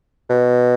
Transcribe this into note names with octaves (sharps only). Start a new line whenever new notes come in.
B2